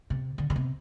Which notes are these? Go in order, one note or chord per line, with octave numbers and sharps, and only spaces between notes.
C3
D3
D3
C3